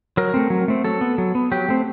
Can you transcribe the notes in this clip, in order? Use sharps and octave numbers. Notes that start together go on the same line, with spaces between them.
F#3 A#4
A3 C4
F#3
A3 C4
F#3 A4
B3
F#3
B3
F#3 G4
A3 C4